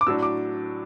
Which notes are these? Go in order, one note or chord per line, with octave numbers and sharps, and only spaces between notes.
D6
A2 F#3 D4 E6
D6